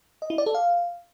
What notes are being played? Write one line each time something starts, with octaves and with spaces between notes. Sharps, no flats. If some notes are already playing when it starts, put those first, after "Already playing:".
D#5
E4
D5
A4
F5